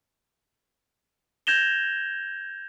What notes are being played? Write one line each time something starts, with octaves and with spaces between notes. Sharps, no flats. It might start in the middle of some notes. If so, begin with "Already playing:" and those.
G6 G#6 A#6 E7 F7 G7